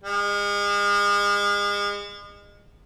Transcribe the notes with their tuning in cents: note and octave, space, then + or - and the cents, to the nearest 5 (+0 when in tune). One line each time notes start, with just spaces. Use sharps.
G#3 -35